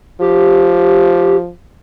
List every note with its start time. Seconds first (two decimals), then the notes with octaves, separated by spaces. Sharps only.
0.21 F3 G4